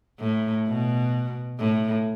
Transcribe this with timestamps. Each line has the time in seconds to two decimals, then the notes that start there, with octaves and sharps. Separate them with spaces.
0.20 A2
0.67 B2
1.59 A2